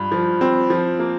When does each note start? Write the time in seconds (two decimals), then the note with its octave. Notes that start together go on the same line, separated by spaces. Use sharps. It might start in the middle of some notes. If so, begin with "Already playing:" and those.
Already playing: G2 F3
0.12 F3
0.41 C4
0.70 F3
0.99 A#3